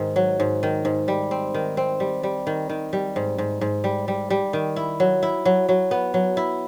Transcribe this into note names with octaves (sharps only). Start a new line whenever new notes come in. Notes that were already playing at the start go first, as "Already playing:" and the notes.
Already playing: G#2 D#3
F#3
G#2
D#3
G#2
G3
C4
D#3
C4
G3
G3
D#3
D#3
G3
G#2
G#2
G#2
G3
G3
G3
D#3
E4
F#3
E4
F#3
F#3
B3
F#3
E4